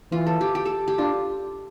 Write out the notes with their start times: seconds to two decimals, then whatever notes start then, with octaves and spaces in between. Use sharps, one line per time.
0.11 E3 F4
0.27 A4
0.41 G4
0.55 G4
0.65 A4
0.88 G4
0.98 D4 F4